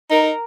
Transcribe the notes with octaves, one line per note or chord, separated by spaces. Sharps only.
D#4 A#4